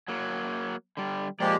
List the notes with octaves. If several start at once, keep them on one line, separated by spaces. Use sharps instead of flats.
F#3 A#3
D3 G3
F3 G#3 A#3 G4 D5